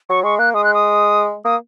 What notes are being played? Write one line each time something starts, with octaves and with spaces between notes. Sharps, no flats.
F#3 C#6
G#3 C#6
A#3 F#6
G#3 D#6
F#6
D#6
A#3 D#6